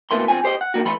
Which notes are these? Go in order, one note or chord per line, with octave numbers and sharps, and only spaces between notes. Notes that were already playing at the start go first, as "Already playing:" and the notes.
D2 B2 E3 A3 A#3 C6
E2 D3 E3 C4 F4 G#5
G4 C5 D5 D#5
F#5
D#2 D3 A#3 F#4
E3 A3 B3 B5 C6